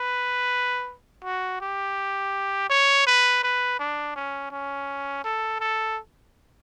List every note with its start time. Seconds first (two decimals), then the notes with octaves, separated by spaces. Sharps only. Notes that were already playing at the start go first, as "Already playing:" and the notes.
Already playing: B4
1.24 F#4
1.61 G4
2.70 C#5
3.07 B4
3.43 B4
3.79 D4
4.16 C#4
4.51 C#4
5.24 A4
5.60 A4